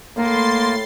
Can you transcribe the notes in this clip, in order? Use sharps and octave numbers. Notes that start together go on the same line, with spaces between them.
A2 A#3 E4 C6 A6 C7